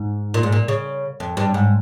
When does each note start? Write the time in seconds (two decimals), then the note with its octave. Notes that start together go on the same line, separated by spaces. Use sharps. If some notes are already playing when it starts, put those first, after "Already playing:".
Already playing: G#2
0.34 A#2
0.43 G#2
0.52 A#2
0.68 C#3
1.20 F2
1.37 G2
1.54 G#2